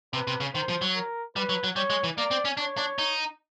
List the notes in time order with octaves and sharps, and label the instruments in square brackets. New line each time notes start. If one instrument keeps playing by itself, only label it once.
[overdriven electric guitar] C3 [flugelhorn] B4
[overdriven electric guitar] C3
C#3
[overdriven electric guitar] D#3 [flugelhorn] C5
[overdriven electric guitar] F3
F#3
[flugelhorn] A#4
[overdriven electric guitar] G3 [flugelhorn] B4
[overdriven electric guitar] F#3
F#3
[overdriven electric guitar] G3 [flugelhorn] C#5
[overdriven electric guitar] G#3
E3
[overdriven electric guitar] A#3 [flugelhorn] D5
[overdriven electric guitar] C4
C#4
[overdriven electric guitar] D4 [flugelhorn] C#5
[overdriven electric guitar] D4
D#4